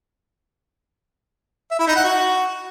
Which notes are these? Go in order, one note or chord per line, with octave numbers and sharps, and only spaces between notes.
E5
E4
D#4
F#5
F#4